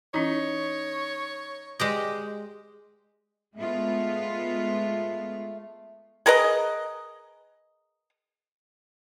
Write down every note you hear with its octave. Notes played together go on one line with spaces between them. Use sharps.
E3 C#4 D#4 E4 C#5
G#3 G4 B4 D5 D#5 C6
G#3 A3 B3 F4
G#4 A#4 B4 D#5